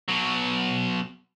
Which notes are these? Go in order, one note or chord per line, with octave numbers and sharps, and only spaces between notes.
B2 F#3